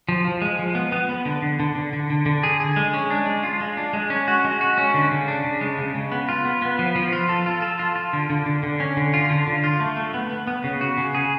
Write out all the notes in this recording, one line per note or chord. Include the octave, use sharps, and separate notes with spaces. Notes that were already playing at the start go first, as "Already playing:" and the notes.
F3
F3
G#3
F3
B3
B3
B3
D3
D3
D3
D3
D3
D3
D3
G#4
G#4
G#3
C#4
D4
G#3
F4
G#3
D4
G#3
C#4
F#4
G#3
F#4
C#4
D3
C#3
D4
C#3
G#3
C#3
C#3
B3
F4
B3
B3
F3
F3
F4
A4
F4
A4
F4
F4
D3
D3
D3
D3
C#4
D3
F4
D3
D3
F4
A3
A3
B3
B3
B3
C#3
F#4
C#3
G#4